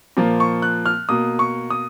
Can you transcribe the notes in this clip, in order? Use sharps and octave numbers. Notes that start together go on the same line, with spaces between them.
A#2 F3 A#3
C#6
F#6
F6
B2 A#3 D#6
C#6
D#6